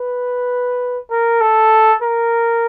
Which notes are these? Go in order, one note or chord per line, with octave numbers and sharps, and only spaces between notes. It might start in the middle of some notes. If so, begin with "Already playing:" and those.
Already playing: B4
A#4
A4
A#4